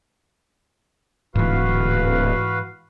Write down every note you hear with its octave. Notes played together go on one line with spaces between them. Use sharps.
D1 G#2 E3 F#4 B4 F5